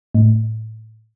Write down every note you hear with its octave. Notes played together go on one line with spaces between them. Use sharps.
A2